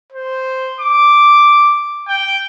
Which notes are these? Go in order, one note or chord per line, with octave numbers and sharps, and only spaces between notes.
C5
D6
G5